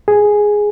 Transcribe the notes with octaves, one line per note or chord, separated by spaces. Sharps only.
G#4